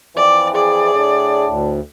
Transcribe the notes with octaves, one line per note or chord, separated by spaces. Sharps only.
F2 E3 D5
G#4 D5
A2 D4
D2